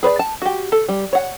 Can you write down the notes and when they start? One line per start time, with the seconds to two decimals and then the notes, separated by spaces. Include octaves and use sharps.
0.03 G#4 B4 C#5 D5
0.19 A5
0.42 F#4 G4
0.72 A4
0.89 G3
1.13 C#5 F#5